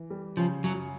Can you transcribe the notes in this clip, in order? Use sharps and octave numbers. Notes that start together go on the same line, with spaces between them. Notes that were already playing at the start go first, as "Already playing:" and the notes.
Already playing: E3
G3
C#3 F3
F#2 F#3